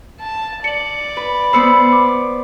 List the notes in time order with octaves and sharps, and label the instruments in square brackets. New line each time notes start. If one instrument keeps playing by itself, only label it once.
[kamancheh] A5
[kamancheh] D5 [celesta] C#7 F#7
[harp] B4
[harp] B3 B4 C5 [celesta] B5 E6 C#7
[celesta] D6